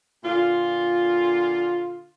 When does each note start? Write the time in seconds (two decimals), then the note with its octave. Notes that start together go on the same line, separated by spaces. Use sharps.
0.24 A#2 D3 F4